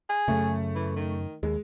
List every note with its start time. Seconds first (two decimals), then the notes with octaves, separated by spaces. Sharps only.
0.09 G#4
0.28 F#2 C#3 A3
0.75 E3
0.96 D#3
1.43 D#2 G#3